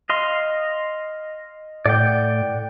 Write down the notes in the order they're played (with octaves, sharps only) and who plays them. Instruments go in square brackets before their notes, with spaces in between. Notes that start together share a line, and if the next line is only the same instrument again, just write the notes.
[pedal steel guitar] D#5 F5 C6
[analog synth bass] A2 [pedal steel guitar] D5 F#5 G5